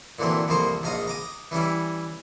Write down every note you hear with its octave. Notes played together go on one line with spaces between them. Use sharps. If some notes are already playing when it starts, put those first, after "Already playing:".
A#2 D3 E3 F#3 C4
C2 F2 F3 A#3 C5 C#6
A#1 G#2 F5 A#5 C#6 D#6
A#5 D6 D#6
E3 G3 C#4 E4